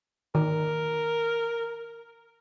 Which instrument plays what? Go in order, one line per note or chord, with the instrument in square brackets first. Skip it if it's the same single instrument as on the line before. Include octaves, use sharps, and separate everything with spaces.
[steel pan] D#3 [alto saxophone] A#4